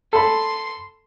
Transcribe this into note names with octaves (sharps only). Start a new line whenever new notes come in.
A4 B5 C6